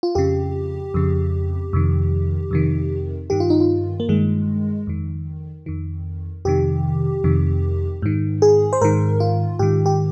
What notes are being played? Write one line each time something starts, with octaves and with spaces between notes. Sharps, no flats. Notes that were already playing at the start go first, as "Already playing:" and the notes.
F4
F2 C#3 G4
F2 C#3
F2 C3 D#3
F2 C3 D#3
G2 D#3 G4
F4
D#4
F4
A#3
G2 D#3 G#3
F2 D#3
F2 D#3
F2 C3 D#3 G4
F2 C3 D#3
G#2 D#3
G#4
C5
G#2 D#3 A#4
F4
G#2 D#3 G4
G4